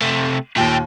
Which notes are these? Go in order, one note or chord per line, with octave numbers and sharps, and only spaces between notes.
C3 A3
D#2 A#2 A3 G5